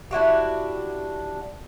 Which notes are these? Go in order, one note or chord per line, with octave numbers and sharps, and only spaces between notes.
D4 E4 F#4 G4